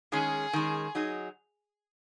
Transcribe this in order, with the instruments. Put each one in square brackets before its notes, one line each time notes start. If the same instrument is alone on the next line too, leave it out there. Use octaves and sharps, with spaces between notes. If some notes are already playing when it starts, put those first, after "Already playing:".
[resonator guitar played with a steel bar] D#3 G#3 C#4 [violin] G#4
[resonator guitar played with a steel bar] D#3 G#3 C#4
F#3 D#4 G#4